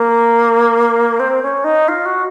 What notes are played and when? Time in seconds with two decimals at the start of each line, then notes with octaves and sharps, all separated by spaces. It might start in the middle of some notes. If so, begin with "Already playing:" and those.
Already playing: A#3
1.20 C4
1.43 C#4
1.64 D#4
1.88 F4
2.06 F#4